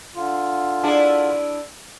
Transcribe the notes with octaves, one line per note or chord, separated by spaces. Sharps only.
D3 F4
D4 E4 G#4